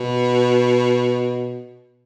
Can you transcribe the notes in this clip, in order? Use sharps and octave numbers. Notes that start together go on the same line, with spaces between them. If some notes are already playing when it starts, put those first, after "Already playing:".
Already playing: B2